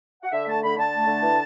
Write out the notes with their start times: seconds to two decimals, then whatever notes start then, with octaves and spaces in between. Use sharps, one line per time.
0.23 F#5
0.32 D3 E5
0.47 A3 A5
0.63 D3 B5
0.77 D3 A5
0.92 A3
1.07 D3
1.22 E3